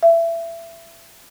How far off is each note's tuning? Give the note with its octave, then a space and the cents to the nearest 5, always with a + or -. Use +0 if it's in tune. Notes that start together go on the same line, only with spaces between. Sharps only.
E5 +25